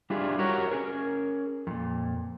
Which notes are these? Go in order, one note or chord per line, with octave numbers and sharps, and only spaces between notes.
G3 D4 E4 F4 G4 G#4
F#4 G4 A#4 C#5
C#4 G#4 A#4
F2 A#2